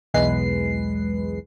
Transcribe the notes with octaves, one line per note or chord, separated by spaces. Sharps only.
B1 E2 G#3 B4 C7